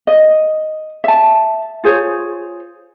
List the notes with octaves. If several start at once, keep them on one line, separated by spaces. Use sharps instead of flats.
D#5
E5 A5
F4 G#4 C5 C#5